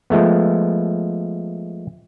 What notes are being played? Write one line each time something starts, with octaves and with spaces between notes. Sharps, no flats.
F3 G#3 A3 B3